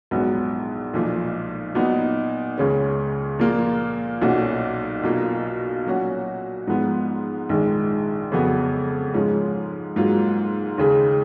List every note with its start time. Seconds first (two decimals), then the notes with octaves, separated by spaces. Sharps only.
0.11 A#1 G#2 F#3 B3
0.94 B1 A#2 F3
1.75 A#2 F#3 B3 D#4
2.58 C#2 C#3 G#3 C#4
3.39 A#2 F3 A#3 F4
4.22 B1 A#2 F#3 C#4 F#4
5.03 B1 B2 A#3 F4
5.86 A#2 F#3 C#4 F#4
6.67 G#2 F3 B3
7.49 A#1 G#2 D#3 G#3
8.32 F2 C#3 F#3 B3
9.14 G#2 F3 G#3 C#4
9.96 G#2 F#3 A#3 F4
10.78 D#2 C#3 G#3